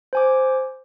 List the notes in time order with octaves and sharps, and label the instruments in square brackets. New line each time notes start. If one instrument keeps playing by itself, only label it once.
[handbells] C5 G#5 D6